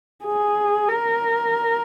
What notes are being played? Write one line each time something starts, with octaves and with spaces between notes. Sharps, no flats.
G#4
A#4